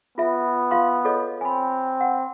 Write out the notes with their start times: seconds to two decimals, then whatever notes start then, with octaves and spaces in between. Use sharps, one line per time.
0.18 B3 F4 E5
0.71 F4 F5 C6
1.05 A4 C#5 D#5
1.41 C4 G#5 B5
2.01 F#5